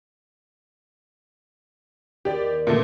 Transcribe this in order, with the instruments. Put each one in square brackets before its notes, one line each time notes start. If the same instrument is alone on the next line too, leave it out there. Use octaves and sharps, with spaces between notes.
[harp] D#2 [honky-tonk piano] G4 D5
[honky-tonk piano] A#2 A3 B3 [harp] D3 F3